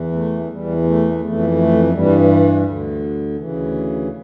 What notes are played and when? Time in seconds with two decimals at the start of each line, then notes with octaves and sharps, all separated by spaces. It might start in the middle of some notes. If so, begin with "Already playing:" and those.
Already playing: E2 E3
0.12 A3
0.48 E2 E3 G3
0.84 A3
1.20 F2 E3 A3
1.56 A3
1.92 G2 E3 G3
2.64 D2 D3
3.36 D2 C#3 E3